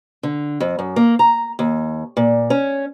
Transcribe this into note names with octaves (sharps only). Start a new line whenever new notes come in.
D3
F2
F#2
A#3
A#5
D#2
A#2
C#4